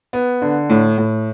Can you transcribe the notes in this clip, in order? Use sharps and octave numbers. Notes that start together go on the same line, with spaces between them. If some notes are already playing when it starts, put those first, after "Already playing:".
B3
D3
A2
A2